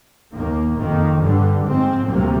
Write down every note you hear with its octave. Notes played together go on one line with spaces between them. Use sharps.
D#2 D#3 A#3
F2 D#3 A#3
G2 D3 G3
G#2 F3 C4
D2 C3 G3 A#3